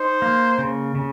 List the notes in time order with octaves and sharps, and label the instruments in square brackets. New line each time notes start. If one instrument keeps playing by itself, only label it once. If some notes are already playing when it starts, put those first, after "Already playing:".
Already playing: [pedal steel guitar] D#4 [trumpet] C5
[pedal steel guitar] A#3
C#3
C#3